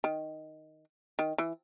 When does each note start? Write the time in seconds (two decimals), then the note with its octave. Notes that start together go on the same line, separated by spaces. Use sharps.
0.04 D#3
1.19 D#3
1.38 E3